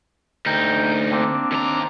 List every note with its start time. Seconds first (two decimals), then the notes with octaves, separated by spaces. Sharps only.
0.46 D2 D#4 A#4 G5 G6
1.11 A#3 C4 D4
1.52 D#2 A#5